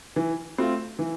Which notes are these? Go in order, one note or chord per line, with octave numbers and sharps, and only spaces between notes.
E3
A3 C4 F4
E3